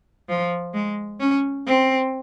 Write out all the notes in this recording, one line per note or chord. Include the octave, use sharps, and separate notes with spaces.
F3
G#3
C#4
C4